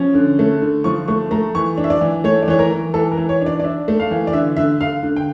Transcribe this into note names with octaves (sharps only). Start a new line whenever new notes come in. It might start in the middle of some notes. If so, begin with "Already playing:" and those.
Already playing: F3 C#4
D3
A3
D3
F3 C#6
A3 C#6
A3 A#5
E3 C#6
D4
E5
D5
E3
A3 C#5
D5
E3 C#5
A#4
E3
E3 A4
A#4
E3
C#5
D4 D5
D5
D4 E5
A3
F5
E3
D5
D3 E5
D3 E5
D3 F5
D3
G5